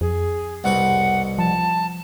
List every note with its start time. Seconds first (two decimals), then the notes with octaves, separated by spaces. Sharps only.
0.01 F2 G#4
0.64 C2 B2 B4 F#5
1.38 F3 A5